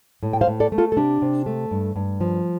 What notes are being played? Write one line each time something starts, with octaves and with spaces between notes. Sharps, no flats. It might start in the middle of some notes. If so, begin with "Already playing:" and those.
A2
G5
C5 F5
A2
A4 D5
A3
F4 A4
A4
C3 D4 G4
C3
A3
G2
G2
F3